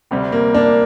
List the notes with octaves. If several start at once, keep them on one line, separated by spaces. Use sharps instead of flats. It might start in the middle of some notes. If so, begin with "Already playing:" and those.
D2 C3 G3
A#3
A#3 D4